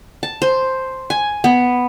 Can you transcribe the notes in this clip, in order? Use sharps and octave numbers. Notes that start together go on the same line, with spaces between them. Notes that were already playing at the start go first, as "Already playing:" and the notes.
A5
C5
G#5
B3